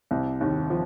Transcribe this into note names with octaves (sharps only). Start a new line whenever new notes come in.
C2 C3
D#2 D#3
F3